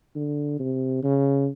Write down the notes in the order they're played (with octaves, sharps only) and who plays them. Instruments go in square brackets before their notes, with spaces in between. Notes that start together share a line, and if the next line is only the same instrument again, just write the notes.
[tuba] D3
C3
C#3